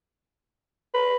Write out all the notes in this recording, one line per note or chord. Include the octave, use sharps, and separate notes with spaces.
B4